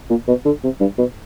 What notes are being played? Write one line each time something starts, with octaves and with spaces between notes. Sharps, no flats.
A#2
B2
D3
C3
G2
B2